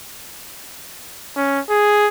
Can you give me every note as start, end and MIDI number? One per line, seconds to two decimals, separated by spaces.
1.37 1.60 61
1.70 2.08 68